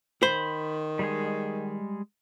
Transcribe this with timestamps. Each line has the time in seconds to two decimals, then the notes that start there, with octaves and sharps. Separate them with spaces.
0.23 D#3 C5 B5
0.99 G3 G#3 G#4